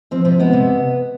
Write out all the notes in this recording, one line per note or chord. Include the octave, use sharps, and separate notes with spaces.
F3 C4
C3 C4
G#3 B3
C3